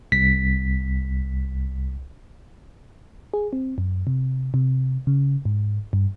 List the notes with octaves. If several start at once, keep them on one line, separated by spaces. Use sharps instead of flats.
C2 B6
G#4
C4
F#2
C3
C3
C#3
G#2
G2